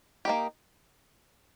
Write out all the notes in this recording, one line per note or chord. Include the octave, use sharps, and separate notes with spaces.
A#3 D#4 G4